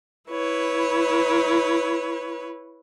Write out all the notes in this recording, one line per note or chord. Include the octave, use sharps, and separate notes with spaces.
E4 B4 C#5